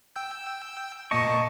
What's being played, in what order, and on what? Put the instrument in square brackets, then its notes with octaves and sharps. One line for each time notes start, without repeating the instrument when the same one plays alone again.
[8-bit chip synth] G5 E6 G6
[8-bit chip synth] A#2 A#3 A5 [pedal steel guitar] D#5 C#6